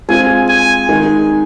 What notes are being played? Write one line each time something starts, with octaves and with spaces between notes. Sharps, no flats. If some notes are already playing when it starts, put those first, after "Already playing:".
G#3 C4 F4 G#4 G#5
G#5
D#3 G#3 D#4